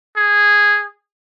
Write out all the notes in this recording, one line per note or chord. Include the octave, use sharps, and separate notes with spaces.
G#4